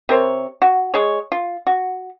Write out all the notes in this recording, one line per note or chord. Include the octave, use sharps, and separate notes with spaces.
C3 A#4 C5 C#5
F#4
G#3 G#4 C#5
F4
F#4